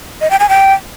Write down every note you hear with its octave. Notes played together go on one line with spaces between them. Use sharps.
D#5
G5
G#5
G5